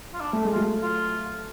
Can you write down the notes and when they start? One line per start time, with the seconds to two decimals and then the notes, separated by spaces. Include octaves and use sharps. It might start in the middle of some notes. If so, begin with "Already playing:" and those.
0.14 F4
0.21 D4
0.33 A3
0.45 G#3
0.52 F#3 A3 F4
0.83 F4